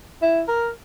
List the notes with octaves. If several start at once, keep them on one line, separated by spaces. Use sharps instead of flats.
E4
A#4